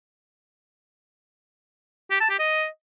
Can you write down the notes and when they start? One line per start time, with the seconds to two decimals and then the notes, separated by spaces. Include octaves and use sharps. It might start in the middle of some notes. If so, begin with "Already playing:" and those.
2.11 G4
2.20 A5
2.30 G4
2.39 D#5